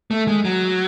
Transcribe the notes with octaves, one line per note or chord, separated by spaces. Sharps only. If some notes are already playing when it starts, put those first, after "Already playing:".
A3
G#3
F#3